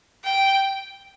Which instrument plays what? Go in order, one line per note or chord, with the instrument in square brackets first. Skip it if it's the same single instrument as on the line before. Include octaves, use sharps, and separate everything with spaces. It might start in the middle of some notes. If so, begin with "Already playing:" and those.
[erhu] G5